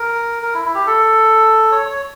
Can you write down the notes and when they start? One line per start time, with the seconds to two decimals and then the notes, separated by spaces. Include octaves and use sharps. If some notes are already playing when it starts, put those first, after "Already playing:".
Already playing: A#4
0.43 A#4
0.54 E4
0.65 E4
0.75 G4
0.87 A4
1.72 C#5
1.86 C#5